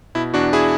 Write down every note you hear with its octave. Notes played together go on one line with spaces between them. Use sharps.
B2 E4
E2 D4 F#4
E4 G#4